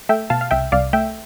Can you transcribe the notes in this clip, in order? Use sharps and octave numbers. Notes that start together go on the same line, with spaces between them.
A3 E5 G5
B2 F5 A5
F5
C2 E5 G5
C2 D5 F5
A3 E5 G5